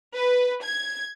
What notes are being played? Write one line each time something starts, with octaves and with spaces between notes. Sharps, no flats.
B4
G#6